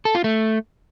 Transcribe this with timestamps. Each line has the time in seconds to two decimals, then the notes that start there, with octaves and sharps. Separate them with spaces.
0.05 A4
0.15 F4
0.24 A3